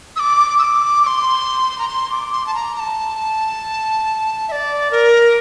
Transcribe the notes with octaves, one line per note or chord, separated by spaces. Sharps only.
E6
D6
E6
D6
D6
C6
A#5
C6
D6
C6
A5
A#5
A#5
A5
E5
D5
A#4